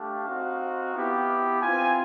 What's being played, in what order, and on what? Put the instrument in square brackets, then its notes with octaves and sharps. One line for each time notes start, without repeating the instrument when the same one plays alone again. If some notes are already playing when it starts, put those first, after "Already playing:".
Already playing: [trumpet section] A3 D4 G4 F5
C4 D#4 F#4
B3 E4 G4
C4 F4 G#5